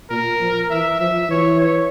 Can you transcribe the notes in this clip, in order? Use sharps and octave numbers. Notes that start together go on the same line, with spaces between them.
A#2 A#4
F3
E3 E5
F3 E5
E3 C#5
C#5